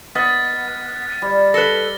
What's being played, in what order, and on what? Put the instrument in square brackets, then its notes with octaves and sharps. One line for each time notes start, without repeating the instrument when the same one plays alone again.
[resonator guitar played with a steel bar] B3 [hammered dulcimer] D#5 [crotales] F6 A6 B6
[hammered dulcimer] G3
[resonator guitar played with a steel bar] A4 B4 [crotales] A#6 C#7 G7